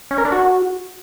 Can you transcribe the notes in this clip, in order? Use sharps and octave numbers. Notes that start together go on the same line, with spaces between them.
C#4
A#4
D4
F#4